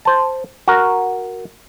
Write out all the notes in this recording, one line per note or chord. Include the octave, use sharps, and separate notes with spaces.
C5 A5
F#4 A#4